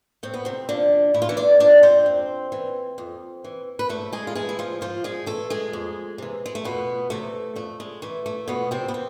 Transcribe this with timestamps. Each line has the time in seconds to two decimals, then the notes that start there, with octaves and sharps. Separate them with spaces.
0.23 A2 C4
0.34 B3
0.45 C3 C4
0.69 D3 F3 D4
1.14 A2 E4
1.22 F4
1.29 E3 E4
1.37 D4 D5
1.60 F3 D4 D5
1.83 C4 C5
2.06 F2
2.52 E3
2.98 F2
3.44 E3
3.79 B4
3.89 G#2 A3 A4
4.13 G#3 G#4
4.27 F4
4.35 E3 G#3 G#4
4.49 E4
4.59 F3 F4
4.81 G#2 F3 F4
5.04 G#3 G#4
5.26 E3 A3 A4
5.50 G#3 G#4
5.73 F2
6.18 C3 E3
6.46 G#3
6.55 A3
6.64 F2 B2 B3
7.10 C3 E3 A3
7.56 F2 A3
7.80 G#3
8.02 E3 A3
8.26 A3
8.48 F2 B2 B3
8.71 C3 C4
8.88 B3
8.94 E3 C4